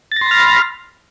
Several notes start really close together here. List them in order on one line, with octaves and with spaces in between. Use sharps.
A6 A#6 C6 B5 F6